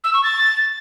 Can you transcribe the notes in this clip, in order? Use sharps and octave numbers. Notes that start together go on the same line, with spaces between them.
E6
C#6
A6